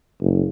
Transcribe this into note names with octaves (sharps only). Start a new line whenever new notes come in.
F#1